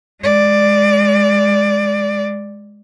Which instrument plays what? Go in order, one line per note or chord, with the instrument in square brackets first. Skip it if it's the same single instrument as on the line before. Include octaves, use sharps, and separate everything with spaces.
[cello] G#3 D5